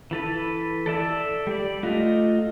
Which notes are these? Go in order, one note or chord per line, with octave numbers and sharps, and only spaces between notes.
E3 A4 B4
A4 D5 E5
G3 D5
A3 D#4 F4 F#4